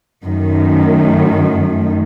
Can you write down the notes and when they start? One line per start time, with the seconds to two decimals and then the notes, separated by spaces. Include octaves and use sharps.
0.24 F#2 D#3 A3